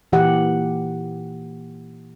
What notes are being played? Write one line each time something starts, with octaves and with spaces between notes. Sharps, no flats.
A#2 E3 G4 F#5